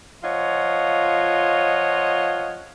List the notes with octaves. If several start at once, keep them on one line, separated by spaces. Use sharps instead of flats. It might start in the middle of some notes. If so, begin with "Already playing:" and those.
F3 F4 C#5 D#5 F#5